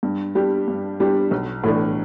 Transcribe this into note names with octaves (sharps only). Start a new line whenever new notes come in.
G2
G3 D4 G4
G2
G3 D4 G4
B1
A2 E3 A3 D4